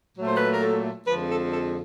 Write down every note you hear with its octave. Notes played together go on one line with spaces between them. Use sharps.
A#2 F#3 A3
C5
B4
A#4
A4
F2 D3 F3 G#3 B4
A4
A4